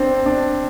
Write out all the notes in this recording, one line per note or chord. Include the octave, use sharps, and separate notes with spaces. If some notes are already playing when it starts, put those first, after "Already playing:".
Already playing: C4 D4
D4